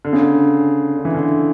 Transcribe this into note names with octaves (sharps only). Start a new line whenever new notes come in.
D3
C#3
D3
D3
E3
D3